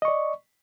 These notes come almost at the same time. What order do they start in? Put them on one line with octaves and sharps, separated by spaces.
D#5 C#6 D5